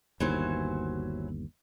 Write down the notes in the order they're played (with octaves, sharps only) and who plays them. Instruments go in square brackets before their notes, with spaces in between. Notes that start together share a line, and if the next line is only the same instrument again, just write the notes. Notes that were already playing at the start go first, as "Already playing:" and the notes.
[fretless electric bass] G1 D#2 [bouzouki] E3 F#3 C5